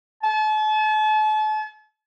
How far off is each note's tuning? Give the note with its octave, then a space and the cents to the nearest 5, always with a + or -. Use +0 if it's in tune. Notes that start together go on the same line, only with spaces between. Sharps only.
A5 -40